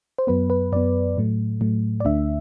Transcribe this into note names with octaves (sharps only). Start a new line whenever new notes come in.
C5
F#2 F#3 B3 B4
B4
F#2 F#3 B3 D5
A2 F#3 A3
A2 F#3 A3
D5
D2 D3 A3 D4 E5